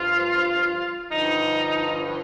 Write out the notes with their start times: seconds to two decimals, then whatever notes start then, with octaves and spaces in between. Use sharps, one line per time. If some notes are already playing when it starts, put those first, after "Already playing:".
Already playing: G2 F3 F4
1.11 G2 D3 F3 D#4